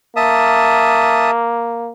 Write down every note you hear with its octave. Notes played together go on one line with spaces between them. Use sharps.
A#3 E5 A5 D#6